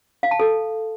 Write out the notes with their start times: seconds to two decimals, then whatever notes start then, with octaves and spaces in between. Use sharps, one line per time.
0.23 F5
0.31 A5
0.40 A4